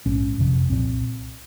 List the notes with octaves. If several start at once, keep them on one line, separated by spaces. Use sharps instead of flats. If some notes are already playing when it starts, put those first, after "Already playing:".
A#1 G#2 C#4
F#1 F2 C3
C2 A#2 C4